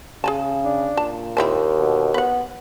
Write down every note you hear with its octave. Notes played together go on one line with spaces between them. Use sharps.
C#3 G#4 G#5 A5
D4
A#2 A5
D#2 C4 E4 A5
B2
B3 B4 F#5